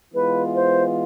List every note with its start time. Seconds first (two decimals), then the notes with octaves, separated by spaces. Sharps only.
0.14 E3 G#3 B3 F4 B4
0.55 C5